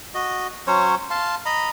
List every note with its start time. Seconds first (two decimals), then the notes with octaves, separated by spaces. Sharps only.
0.14 F#4 D#5
0.67 F#3 C#4 C5 C#5
1.10 F5 A5 C6
1.46 D#5 A#5 B5